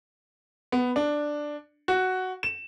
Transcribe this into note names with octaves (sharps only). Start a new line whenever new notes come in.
B3
D4
F#4
E7